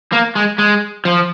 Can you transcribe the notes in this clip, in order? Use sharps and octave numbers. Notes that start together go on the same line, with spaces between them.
A#3
G#3
G#3
F3